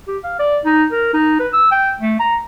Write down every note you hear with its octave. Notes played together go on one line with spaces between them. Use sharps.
G4
F5
D5
D#4
A#4
D#4
B4
E6
G5
A3
A#5